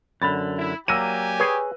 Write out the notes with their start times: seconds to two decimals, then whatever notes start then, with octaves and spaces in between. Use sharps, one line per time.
0.22 F#2 D3 B5 A6
0.57 E4
0.88 F#3 A#3 G4 D5 G#5 E6 A#6 D#7
1.39 G#4 B4 C#5